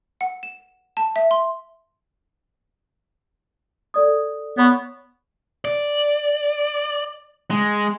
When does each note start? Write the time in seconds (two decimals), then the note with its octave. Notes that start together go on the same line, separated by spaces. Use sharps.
0.21 F#5
0.43 E7
0.97 A5
1.16 E5
1.31 C6
3.94 A4 D5 D#6
4.58 B3 C#5 B5 C#6
5.65 D5
7.51 G#3